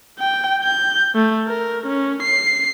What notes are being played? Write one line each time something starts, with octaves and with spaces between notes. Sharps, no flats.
G5
G6
A3
A#4
C#4
C7